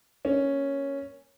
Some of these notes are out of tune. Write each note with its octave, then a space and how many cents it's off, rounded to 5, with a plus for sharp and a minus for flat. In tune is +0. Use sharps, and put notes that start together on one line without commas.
A#3 +0 C#4 +0